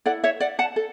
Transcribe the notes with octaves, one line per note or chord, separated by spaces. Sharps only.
E4 A4 D5 F#5
C#5 E5
D5 F#5
F#5 A5
A4